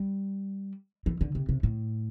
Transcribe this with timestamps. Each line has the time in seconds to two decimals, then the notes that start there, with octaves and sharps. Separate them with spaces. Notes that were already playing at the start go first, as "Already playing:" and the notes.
Already playing: G3
1.06 E3
1.21 D3
1.35 C3
1.49 C3
1.63 A2